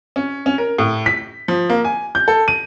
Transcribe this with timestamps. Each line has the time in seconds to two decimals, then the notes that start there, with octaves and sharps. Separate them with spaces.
0.16 C#4
0.46 C#4
0.58 A#4
0.78 A2
1.06 B6
1.48 F3
1.70 A#3
1.85 G#5
2.15 G6
2.28 A4
2.48 D#7